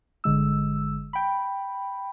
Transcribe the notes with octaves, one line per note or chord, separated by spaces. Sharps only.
G1 D3 G#3 E6
G5 B5